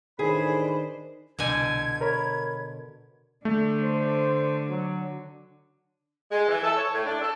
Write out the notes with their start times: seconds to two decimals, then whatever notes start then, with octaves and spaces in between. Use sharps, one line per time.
0.19 A2 D#3 E3 D4 G#4 C5 B5
1.39 C2 B2 D3 G#5 G6 G#6
2.01 A#4 C#5 B5
3.45 D3 A3
3.82 C5
4.69 F#3
6.32 G#3
6.49 E3
6.64 A4
6.77 C#5
6.94 A2
7.05 D4
7.22 A4